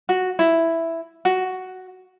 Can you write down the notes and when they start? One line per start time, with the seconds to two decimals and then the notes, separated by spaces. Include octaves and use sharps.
0.09 F#4
0.39 E4
1.25 F#4